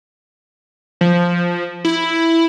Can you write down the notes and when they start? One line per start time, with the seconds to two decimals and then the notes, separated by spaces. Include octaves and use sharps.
1.01 F3
1.85 E4